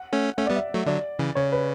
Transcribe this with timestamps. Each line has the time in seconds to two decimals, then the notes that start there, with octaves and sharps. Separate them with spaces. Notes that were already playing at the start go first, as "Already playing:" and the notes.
Already playing: F#5
0.13 A3 C#4
0.38 A3 C#4 E5
0.46 G3 B3 D5
0.56 E5
0.74 F#3 A3
0.86 D3 F#3 D5
1.19 C#3 E3
1.35 C#3 C#5
1.52 B4